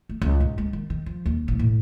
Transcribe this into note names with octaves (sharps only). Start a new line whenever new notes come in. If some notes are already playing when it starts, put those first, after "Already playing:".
A3
C#2
G#2
G#3
D#3
D#3
F3
D#2
A1
A2